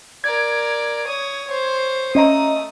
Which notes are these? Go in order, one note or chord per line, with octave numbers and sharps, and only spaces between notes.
A#4 D5 G#6
C#5 D#6
C5 C#5
A3 C#4 D#5 A#5 D#6